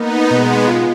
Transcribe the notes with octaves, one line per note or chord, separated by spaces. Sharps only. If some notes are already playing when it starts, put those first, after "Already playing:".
Already playing: A#3 B3 D#4
B2 G#3 B3
F4